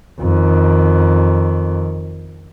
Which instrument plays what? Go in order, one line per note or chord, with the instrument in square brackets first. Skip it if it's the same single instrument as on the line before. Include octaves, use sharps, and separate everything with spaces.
[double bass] F2 D#3